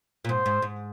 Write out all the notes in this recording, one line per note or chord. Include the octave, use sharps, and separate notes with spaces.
A#2
G#2 C5
G#2
G#2